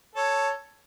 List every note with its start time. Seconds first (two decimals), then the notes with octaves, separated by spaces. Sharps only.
0.15 A4 C#5